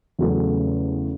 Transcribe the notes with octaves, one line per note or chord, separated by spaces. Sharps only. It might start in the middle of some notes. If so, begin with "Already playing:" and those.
E2 C#3 F#3 A3